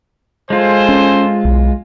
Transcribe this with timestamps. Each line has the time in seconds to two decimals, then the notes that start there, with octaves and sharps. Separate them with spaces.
0.50 G#3 F4 G#4 A4 C5
0.89 C#4
1.45 B1